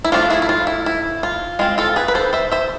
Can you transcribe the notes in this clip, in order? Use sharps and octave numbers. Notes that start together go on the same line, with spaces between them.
E4
F3 A3 D4 F4
E4 G#4
E4
F4
E4
E4
F4
G#3 C4 F4
F4 A4
G#4 B4
B4
A4 C5
C5 E5
C5 E5